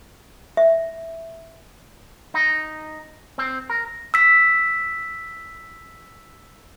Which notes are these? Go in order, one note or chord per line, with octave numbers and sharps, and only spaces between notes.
E5
D#4
C4
A#4
E6 B6